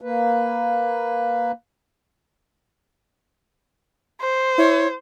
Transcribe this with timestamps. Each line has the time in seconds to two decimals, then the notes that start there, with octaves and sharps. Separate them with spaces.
0.01 A#3 B4
4.21 C5
4.58 E4 C#5